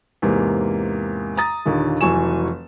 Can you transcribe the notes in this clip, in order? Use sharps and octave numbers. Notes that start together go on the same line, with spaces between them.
E2 G#2 C3 A#3
A#5 D#6 A6
D#2 A#2 D3 D#3
F1 E3 F#3 G#5 C#6 E7